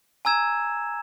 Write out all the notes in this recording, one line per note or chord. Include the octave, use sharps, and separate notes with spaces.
G#5 A#5 E6 G#6 E7